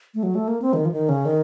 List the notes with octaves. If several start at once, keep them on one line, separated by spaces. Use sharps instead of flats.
A3
F#3
A3
A#3
C4
D#3
F3
D#3
C#3
D#3